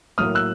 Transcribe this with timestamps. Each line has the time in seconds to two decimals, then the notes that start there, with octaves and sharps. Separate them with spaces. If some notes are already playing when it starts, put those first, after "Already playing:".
0.18 A2 F#3 A#3 D#6 F6
0.35 E6 F#6